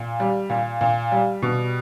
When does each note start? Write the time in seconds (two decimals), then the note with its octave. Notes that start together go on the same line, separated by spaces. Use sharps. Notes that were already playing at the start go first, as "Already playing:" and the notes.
Already playing: A#2
0.20 G3
0.50 A#2
0.81 A#2
1.12 G3
1.42 B2